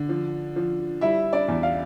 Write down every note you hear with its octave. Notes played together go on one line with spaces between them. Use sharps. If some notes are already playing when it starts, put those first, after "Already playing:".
Already playing: D3
F3
F3
G3 E4 E5
D4 D5
E2
F5